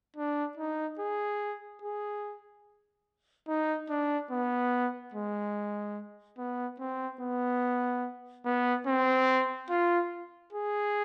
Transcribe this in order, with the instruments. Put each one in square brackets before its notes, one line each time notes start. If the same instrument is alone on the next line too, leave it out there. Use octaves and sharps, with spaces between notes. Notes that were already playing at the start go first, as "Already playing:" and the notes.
[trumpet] D4
D#4
G#4
G#4
D#4
D4
B3
G#3
B3
C4
B3
B3
C4
F4
G#4